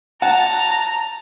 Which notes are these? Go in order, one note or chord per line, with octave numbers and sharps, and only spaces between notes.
F#5 A5 A#5